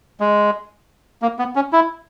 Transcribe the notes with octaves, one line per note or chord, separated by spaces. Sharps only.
G#3
A#3
B3
C#4
E4